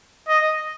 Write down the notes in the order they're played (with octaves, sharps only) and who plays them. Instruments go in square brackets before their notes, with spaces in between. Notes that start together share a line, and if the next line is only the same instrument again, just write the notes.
[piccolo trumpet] D#5